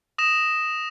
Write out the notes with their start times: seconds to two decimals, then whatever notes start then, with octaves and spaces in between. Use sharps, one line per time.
0.18 D#6 A#6 E7